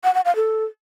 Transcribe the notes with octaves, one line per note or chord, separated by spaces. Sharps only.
F#5
F#5
F5
A4